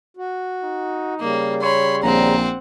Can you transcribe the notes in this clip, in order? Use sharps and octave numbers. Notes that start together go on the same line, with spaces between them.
F#4
D#4
C#3 G3 A#3
C#5 B5 C6
A#1 C4 F#5 A#5